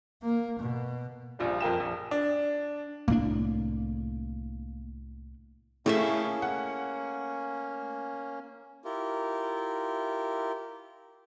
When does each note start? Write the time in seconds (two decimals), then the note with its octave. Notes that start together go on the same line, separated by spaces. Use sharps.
0.23 A#3
0.60 B2
1.39 A#1 F3 G3
1.60 F2 A#4 G5 E7
1.80 A#1
2.11 D4
3.08 C2 A2 A#3 D4
5.86 A2 A3 A#3 C#4 G#4 E5
6.42 F#5
8.85 E4 F4 G4 A#4